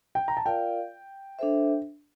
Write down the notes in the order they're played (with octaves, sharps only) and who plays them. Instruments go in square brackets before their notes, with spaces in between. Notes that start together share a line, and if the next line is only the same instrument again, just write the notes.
[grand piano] G5
A#5
A5
[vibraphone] F4 A#4 D5 F5 [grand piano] G5
[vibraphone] D4 A4 C5 E5